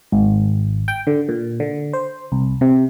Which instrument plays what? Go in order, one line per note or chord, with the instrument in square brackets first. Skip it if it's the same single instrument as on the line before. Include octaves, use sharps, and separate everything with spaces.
[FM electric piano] G#1
G5
D3
A#2
D3
C5
C2
C3